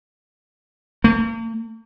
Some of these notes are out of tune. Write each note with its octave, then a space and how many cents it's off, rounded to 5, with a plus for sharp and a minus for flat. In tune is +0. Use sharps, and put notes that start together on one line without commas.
A#3 -45